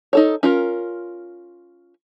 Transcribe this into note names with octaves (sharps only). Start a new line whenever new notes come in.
D#4 A4 C#5
C#4 F4 A#4